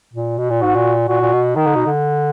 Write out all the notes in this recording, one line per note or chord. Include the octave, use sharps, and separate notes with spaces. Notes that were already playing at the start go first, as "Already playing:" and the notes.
A#2
B2
A#2
G#2 F#4
A#2
A#2 F#4
A#2
B2
D#3 D#4
D3
B2
D3